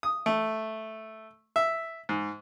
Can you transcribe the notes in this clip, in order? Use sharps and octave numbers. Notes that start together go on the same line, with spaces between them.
D#6
A3
E5
G#2